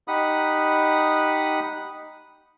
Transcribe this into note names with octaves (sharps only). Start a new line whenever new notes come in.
D#4 G4 F#5 B5 D#6